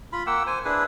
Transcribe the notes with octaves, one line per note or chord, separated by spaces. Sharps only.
F4 B5
A#3 F#5 G5 E6
C5 G#5
D4 E4 G#4 B4